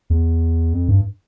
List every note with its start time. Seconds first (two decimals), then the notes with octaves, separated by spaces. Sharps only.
0.10 E2
0.73 F2
0.88 G2